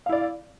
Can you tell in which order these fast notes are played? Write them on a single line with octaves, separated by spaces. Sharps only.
F5 E4 D5